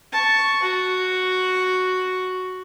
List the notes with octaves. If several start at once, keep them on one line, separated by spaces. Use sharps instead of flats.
A5 C#6
F#4